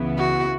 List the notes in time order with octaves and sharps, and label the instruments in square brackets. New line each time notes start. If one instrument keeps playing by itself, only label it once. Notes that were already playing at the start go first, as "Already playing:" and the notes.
Already playing: [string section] C#2 C#3 E3 B3 E4
[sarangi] F#4